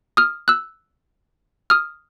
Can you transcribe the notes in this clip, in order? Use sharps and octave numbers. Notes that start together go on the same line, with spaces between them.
D#6 F6
E6 F#6
D#6 F6